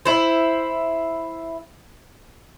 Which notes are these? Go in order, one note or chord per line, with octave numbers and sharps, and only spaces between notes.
E4 C5